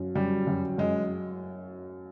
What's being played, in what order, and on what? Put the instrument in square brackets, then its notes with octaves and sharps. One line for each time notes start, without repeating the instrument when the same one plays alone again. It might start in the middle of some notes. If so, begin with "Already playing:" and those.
Already playing: [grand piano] F#2
[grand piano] F#2 [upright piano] G3
[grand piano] F#2
[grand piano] F#2 [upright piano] G#3